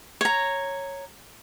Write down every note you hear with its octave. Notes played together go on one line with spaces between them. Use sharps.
C#5 A#5